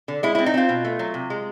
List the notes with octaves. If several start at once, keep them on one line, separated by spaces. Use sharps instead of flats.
D3
G#3 E4
C4 E4
D#4
C4 F4
B2
A3
F#3
C3
G#3